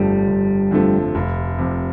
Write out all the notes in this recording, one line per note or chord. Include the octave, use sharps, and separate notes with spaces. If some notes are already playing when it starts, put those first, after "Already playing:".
Already playing: G1 F2 D3 F3 G3 A3
G1
F2 D3 F3 A3
F1
F2 C3